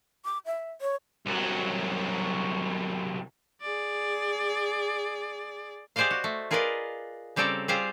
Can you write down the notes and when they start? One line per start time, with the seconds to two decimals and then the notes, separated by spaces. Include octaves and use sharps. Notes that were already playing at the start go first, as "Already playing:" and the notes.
0.25 D6
0.46 E5
0.81 C#5
1.26 C2 F#3
3.61 G#4 D5
5.96 G4 G#4 C5 D5 D#5 F5
6.11 F#4
6.24 A3
6.51 F4 G#4 A#4 B4 D5 D#5
7.36 C#3 G3 C4 A4 D5 A#5
7.68 G3 C4 F4 G4 G#4 C5